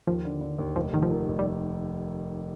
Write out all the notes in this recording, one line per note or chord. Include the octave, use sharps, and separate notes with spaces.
D#2 F3
D3
D3
D#2
F1 F3
F1 D#3
F3
D#3
F1
G3